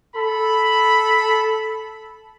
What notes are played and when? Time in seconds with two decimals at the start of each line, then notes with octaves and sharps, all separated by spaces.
0.15 A4 B5